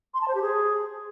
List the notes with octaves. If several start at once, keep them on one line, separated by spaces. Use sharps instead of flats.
C6
A5
C5
G4
G#4